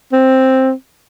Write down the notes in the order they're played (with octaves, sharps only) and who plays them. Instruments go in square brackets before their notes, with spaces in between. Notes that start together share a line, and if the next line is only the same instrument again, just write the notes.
[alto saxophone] C4